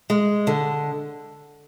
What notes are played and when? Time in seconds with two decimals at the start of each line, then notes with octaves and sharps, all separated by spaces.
0.10 G#3
0.47 D3